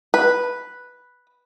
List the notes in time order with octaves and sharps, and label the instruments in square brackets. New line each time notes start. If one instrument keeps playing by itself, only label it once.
[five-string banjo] B4